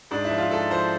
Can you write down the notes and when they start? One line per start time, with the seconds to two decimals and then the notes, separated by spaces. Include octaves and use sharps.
0.11 G#2 D4
0.25 E4
0.31 F3
0.38 F4
0.51 G#2 A4
0.71 F3 C5